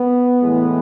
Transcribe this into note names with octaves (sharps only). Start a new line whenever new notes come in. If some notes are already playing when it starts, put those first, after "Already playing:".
Already playing: B3
A2 E3 G#3